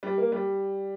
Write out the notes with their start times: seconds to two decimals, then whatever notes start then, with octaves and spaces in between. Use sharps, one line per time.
0.03 G3
0.18 A#3
0.32 G3